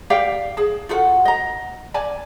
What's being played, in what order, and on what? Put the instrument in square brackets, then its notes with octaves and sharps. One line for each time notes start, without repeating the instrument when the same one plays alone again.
[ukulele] G4 D5 F5 G5
G#4 A5
F4 F#4 A4 F#5
D#5 A#5
D5 G#5 A5